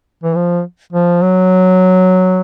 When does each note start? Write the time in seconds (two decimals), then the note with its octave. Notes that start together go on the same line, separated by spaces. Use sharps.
0.24 E3
0.35 F3
0.93 F3
1.22 F#3